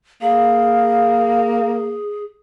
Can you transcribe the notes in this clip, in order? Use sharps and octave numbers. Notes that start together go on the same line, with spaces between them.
A#3 G#4 F5